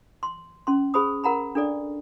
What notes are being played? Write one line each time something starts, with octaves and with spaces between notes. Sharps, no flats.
C6
C#4 C6
G#4 C5 B5 D#6
A#4 F#5 A#5 B5
D4 A4 D5